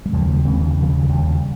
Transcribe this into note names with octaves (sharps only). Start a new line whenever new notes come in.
G3
D#2 C#3 F3 G#3
G3 A#3
D#2 C#3 G#3 C4
D#3
D#2 C#3 F3
D#3 G3
D#2 C#3